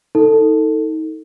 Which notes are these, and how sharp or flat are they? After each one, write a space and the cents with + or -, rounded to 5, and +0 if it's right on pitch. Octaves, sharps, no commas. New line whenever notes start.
D#4 +30 A4 +20